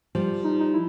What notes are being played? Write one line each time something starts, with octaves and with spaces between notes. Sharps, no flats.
F3 G3
D#4
D#4
E4